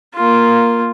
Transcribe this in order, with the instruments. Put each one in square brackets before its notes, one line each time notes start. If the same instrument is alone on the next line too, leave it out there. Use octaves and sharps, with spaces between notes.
[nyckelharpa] A#3 F4